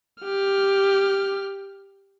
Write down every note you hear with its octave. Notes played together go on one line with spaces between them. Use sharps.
G4 F6